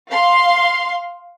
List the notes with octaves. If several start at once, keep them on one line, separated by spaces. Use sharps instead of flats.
F5 C6